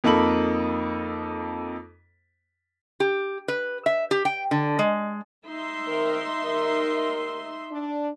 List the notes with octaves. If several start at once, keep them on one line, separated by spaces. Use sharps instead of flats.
F2 A#3 D#4 A4 B5 F#7
G4
B4
E5
G4
G5
D3
G#3
D#4 E5 C6
D#3 C4 A#4
D#2 D#3 A#4
D4